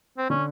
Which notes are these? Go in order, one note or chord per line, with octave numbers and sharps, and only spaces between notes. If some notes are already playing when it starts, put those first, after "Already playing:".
C4
D3 C#4